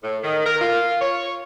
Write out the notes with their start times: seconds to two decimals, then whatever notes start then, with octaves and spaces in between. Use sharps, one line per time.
0.02 A2
0.22 D#3
0.44 A#4
0.59 F4
1.00 C#5